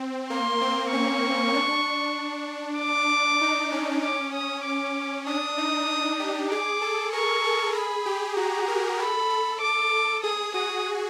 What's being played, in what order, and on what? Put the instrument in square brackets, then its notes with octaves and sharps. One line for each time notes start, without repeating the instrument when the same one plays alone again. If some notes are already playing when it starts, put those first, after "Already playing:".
Already playing: [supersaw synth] C4
[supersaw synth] A#3 [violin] C6
[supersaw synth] C4
[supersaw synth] C#4 [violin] C#6
[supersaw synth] D4
[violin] D6
[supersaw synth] D#4
C#4
[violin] D6
D#6
D6
[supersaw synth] D4 [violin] D#6
[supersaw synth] D#4
D#4
G4
[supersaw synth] G#4 [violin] D6
[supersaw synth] A4
[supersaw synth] A#4 [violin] C#6
[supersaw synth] A4
[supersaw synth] G#4 [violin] B5
[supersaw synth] G4
[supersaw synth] F#4 [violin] A#5
[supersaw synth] A#4
[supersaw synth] A4 [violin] B5
[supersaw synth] A4
[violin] D6
[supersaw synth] G#4 [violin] D#6
[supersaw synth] F#4 [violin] D#6